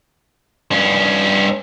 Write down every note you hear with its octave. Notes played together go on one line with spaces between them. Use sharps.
G2 C#4